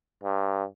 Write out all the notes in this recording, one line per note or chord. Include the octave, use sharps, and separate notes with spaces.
G2